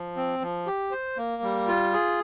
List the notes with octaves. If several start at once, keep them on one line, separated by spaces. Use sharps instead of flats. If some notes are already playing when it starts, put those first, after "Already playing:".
Already playing: F3
C4
F3
G4
C5
A#3
G3
F4
G#4